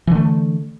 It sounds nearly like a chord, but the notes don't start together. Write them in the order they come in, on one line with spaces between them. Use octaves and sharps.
E3 D3 A3